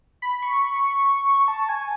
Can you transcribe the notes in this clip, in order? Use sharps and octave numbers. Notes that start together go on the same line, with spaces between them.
B5
C#6
A5
G#5